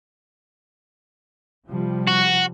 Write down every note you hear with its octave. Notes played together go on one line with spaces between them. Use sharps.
C3 F3 G3
F#4